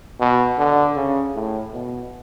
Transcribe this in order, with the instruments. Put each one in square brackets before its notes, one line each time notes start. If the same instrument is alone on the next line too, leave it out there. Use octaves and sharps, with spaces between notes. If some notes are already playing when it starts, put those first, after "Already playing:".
[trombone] B2
D3
C#3
A2
B2